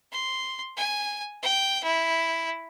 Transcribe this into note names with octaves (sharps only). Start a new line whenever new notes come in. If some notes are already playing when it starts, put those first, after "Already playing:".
C6
G#5
G5
E4